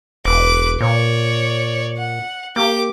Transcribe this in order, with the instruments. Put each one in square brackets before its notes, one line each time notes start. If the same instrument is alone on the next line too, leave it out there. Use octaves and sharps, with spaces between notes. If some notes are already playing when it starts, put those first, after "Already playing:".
[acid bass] E1 [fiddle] B4 D6
[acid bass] A#2 [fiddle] C#5 D5
[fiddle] F#5
[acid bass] A#3 [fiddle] G4 D6